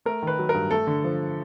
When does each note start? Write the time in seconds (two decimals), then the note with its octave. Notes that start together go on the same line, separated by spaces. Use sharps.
0.05 A3 A#4
0.22 D#3 B4
0.39 F#3
0.49 A#4
0.54 G2
0.71 A3 A4
0.87 D3
1.04 F3